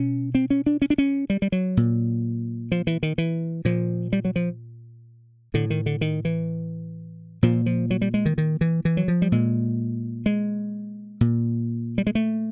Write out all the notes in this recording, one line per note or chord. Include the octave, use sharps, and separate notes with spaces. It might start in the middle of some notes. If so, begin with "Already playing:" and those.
Already playing: B2 C#4
C4
C#4
D4
C#4
D4
C#4
G3
G3
F#3
A#2
F3
E3
D#3
E3
A#2 F3
G3
F#3
F3
A2 D3
D#3
D3
D#3
E3
A#2 F3
F3
F#3
G3
G#3
D#3
D#3
E3
E3
F#3
F3
G3
A#2 G#3
G#3
A#2
G3
G#3
A3